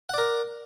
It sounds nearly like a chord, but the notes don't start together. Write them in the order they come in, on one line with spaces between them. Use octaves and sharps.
F#5 D5 A#4